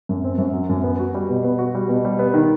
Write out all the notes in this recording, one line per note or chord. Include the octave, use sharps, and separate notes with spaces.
F#2
C4
F#2
F#3
F#2
B3
F#4
G3
B2
B3
F#4
G3
B2
G3
B3
D#3